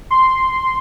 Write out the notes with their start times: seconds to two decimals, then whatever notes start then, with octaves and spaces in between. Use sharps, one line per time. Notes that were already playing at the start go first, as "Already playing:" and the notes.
0.10 C6